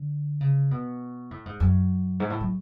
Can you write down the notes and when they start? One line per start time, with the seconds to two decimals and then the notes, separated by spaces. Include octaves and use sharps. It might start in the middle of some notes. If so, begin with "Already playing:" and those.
Already playing: D3
0.41 C#3
0.71 B2
1.31 A2
1.46 G#2
1.60 F#2
2.20 G#2
2.30 A2
2.40 F#3